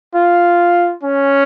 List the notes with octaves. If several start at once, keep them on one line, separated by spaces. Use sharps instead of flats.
F4
C#4